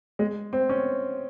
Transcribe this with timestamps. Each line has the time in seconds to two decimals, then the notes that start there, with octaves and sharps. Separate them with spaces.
0.19 G#3
0.53 C4
0.69 C#4